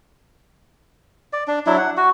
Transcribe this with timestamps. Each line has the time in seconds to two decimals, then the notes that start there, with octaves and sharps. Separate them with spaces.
1.33 D5
1.48 D4
1.67 F#3 D4 E4
1.78 F#5
1.97 F#4